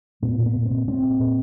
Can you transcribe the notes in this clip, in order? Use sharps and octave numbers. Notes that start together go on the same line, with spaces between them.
A#2 B3
A#2
B3
A#2
C4
A#2
A#2 C4
A#2
A#2